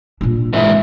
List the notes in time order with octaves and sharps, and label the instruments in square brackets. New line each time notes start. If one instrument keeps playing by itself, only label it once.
[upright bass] A#2 D4
[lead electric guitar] G#2 E3 [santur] E5